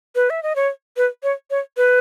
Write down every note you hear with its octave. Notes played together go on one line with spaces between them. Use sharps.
B4
E5
D#5
C#5
B4
C#5
C#5
B4